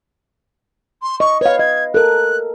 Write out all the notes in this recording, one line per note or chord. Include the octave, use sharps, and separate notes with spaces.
C6
D#5 C#6
B4 C#5 F5
D#5 G#6
A4 A#4 F#6